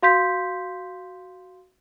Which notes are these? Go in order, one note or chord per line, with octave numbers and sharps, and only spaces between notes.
F#4 F5 C6 G6 B6